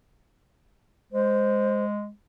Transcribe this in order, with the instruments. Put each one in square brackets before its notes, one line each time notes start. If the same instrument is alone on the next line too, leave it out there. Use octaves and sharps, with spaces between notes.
[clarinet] G#3 [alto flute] C5